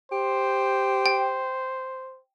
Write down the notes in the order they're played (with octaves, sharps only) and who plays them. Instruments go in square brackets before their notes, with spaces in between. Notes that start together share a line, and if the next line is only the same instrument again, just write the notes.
[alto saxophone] G4 [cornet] C5
[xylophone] G5